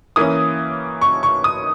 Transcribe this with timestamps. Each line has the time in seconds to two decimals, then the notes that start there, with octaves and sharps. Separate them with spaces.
0.16 E3 A#3 C#4 D#6
1.02 C#6
1.23 C#6
1.44 D#6